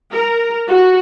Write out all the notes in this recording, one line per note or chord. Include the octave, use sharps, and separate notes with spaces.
A#4
F#4